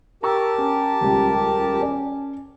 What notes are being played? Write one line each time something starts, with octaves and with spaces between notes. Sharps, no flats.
G4 A#4 A5 A#5 C#6 E6
C#4
D#1 C#2
C#4 D5